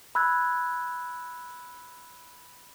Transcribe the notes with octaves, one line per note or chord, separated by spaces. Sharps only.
B5 E6 F#6 G#6